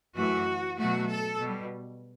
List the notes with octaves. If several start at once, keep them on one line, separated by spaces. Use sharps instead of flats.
F#2 E3 A3 F#4
B2 F#3 A3 F#4
A4
B2 G3